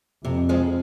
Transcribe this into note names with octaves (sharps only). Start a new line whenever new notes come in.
F2 C3
F3 G#3